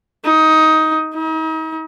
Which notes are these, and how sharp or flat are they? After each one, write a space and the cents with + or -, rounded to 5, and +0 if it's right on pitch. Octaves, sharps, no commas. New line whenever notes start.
D#4 +15
D#4 +40